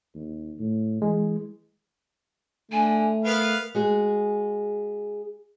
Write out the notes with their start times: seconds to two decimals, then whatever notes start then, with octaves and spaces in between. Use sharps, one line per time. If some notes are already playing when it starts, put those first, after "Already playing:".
0.15 D#2
0.59 A2
1.02 E3 G#3
2.71 D3 A3 G#5
3.25 B3 A#4 B4 F5
3.75 G#3 F#4 G#4